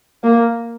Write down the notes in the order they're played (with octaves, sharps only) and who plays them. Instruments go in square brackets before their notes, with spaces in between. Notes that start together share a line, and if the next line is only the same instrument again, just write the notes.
[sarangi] A#3